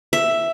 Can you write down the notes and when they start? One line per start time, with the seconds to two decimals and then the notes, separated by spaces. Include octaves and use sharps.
0.13 E5